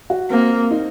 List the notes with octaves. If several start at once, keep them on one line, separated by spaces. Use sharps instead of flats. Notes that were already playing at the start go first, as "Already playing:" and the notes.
F#4
A#3 C4
D#4